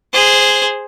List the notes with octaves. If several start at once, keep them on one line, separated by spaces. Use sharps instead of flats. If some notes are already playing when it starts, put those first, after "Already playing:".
G#4 C5